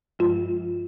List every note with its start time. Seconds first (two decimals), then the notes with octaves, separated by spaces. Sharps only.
0.19 G2 F3 G#3 F4